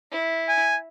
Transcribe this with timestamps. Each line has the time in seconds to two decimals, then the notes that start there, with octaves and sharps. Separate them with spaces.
0.12 E4
0.49 G#5